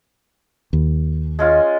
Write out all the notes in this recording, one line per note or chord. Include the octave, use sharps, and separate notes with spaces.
D#2
G#3 C#4 F4